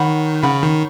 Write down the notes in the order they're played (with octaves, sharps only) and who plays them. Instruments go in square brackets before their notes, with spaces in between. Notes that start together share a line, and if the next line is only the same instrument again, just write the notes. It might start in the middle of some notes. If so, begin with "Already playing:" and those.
Already playing: [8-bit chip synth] D#3 [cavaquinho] C#5 F#5 B5
[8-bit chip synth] C#3 [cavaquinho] C#5 F#5 B5
[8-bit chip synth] D#3